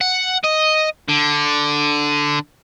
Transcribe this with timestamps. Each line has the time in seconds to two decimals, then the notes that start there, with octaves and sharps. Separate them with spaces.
0.01 F#5
0.44 D#5
1.09 D3